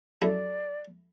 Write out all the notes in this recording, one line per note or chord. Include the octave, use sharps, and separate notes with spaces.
F#2 A3 E4 D5